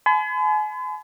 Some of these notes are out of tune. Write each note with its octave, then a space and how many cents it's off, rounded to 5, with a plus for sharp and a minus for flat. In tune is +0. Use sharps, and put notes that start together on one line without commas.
G#5 +40 B5 +45